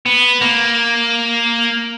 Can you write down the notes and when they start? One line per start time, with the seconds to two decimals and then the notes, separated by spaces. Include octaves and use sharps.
0.06 B3
0.41 A#3